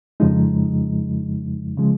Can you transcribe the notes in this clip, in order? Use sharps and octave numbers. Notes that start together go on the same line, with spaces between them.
F2 C#3 F3 G#3 D#4
C#3 F3 G#3